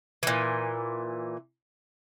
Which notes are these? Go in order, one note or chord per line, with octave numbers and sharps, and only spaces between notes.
A#2 E3